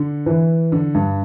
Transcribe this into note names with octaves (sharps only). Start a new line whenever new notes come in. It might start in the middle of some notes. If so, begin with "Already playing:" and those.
Already playing: D3
E3
D3
G2